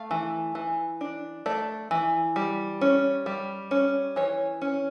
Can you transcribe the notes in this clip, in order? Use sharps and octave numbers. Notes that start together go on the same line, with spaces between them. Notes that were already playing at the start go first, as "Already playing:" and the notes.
Already playing: A3 F5
E3
E3
D4
A3 D5
E3
G3
C#4
G3
C#4
E3 C#5
C#4